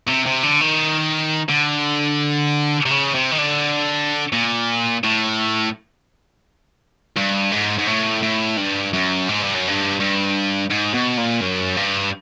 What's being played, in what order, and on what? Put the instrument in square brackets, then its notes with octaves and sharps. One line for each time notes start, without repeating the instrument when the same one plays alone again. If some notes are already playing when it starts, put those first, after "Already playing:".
[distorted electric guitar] C3
C3
D3
D#3
D3
C3
C#3
C3
D#3
D3
A#2
A2
G2
G#2
G#2
A2
A2
G2
F#2
G#2
G2
F#2
G2
G2
G#2
B2
A#2
F#2
G2